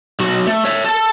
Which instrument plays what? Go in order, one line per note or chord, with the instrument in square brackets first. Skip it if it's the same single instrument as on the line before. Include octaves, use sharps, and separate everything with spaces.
[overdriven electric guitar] B1 F#4
A3
C#5 E5
A4 A5